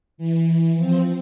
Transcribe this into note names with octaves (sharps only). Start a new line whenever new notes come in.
E3
F3 C4